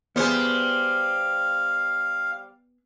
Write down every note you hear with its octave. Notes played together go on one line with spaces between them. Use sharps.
G3 B3 G#4 C5 F5